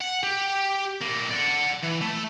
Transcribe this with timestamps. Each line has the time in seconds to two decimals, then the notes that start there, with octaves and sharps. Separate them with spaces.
0.01 F#5
0.23 G4
1.02 A2 A#3
1.31 D5 F#5
1.84 E3
2.02 A3